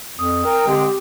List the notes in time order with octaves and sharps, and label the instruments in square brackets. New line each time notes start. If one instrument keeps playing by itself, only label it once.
[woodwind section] F2 [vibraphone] D#6
[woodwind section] A#4 [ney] G5
[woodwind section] D3 G#3 C4 [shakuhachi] G4